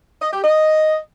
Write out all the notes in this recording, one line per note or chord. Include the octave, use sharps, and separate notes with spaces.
D#5
G4
D#5